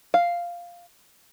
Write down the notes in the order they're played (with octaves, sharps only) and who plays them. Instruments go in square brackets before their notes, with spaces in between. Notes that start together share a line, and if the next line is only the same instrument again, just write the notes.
[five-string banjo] F5